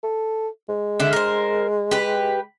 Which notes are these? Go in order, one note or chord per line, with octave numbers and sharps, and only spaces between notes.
A4
G#3
D3 E5
A#4 C5
G4 B4